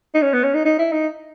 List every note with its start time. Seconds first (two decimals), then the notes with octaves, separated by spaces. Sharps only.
0.15 D#4
0.22 C#4
0.33 B3
0.43 C#4
0.55 D#4
0.65 D#4
0.79 E4
0.93 D#4